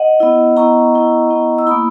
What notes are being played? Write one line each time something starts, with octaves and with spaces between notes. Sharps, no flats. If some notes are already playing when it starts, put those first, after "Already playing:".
Already playing: D#5 F#5
B3 E4
B3 E4 A#5 C#6
B3 E4
B3 E4
E6
A#3 E4 B5 D#6